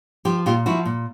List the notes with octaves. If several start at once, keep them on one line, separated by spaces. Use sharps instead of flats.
F3 G4
A#2 F4 G4
F3 E4 F#4
A#2